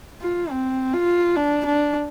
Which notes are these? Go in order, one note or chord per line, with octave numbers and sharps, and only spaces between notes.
F4
C4
F4
D4
D4